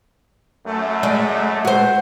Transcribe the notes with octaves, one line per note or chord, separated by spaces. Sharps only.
F#2 A3
G#3 D5
F#4 C5